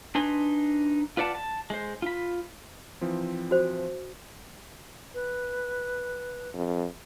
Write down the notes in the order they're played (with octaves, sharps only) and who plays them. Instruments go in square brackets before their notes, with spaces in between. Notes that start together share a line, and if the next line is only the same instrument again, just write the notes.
[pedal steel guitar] D4 D#4 B4 G#5 C6
F4 B4 D5 F#5 A5
A5
G#3 C5
F4 B5
[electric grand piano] E3 F3 C4
[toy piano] F#4 C5
[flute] B4
[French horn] F2